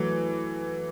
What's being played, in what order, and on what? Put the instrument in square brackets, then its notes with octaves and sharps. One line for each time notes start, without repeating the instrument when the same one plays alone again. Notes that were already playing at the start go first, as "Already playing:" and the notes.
Already playing: [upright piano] E3 [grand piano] F#3 A3